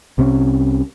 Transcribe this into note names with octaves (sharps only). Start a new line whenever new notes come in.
C2 C3 C4 C#4